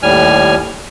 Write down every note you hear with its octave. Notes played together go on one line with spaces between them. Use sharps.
D#2 A2 G3 G#5 F6